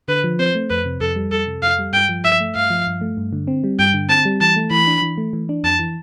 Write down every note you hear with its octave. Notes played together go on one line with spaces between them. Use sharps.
D3 B4
F3
C4 C5
A3
F2 B4
C3
F2 A4
G3
F2 A4
C3
F2 F5
G3
G2 G5
F3
G2 E5
A3
G2 F5
F3
G2
A3
G2
D3
C4
G3
G2 G5
D3
C4 A5
G3
E3 A5
A3
E3 B5
D4
E3
A3
E3
D4
F2 A5
E3